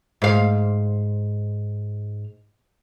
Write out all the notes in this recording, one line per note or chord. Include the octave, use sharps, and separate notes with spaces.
G#2 F5